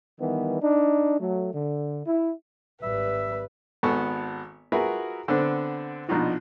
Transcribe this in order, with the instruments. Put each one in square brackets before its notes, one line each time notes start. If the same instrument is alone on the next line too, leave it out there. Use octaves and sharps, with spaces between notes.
[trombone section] D#3 E3 G3 B3
D4 D#4
F#3 A3
D3
E4
[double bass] G#1 G3 [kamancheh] B4 [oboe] E5
[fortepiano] G#1 B3 A4 A5 C#6
F4 F#4 G#4 A#4 B4 E5
D3 B3 C4 D4
A#1 B2 D4 D#4 F4 F#4